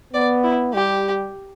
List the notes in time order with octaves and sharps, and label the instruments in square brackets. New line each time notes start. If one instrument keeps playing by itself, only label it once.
[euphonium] B3 [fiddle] D5
[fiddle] E4
[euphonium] G3 [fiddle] G4